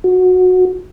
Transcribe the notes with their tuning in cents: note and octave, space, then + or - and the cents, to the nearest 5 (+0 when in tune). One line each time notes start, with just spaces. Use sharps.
F#4 -15